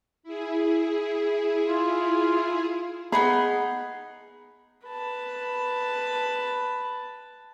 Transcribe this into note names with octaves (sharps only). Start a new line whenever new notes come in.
E4 G#4
F4
B3 D#4 G#4 B5
B4 A5